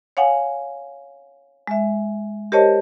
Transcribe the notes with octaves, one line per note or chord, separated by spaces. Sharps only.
C#5 F5 F#5 G#5
G#3 E5
G4 A#4 C5 C#5 D#5 A5